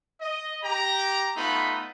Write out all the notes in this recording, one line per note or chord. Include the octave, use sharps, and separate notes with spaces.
D#5
G4 G5 A#5
A3 B3 D#4 F4 B5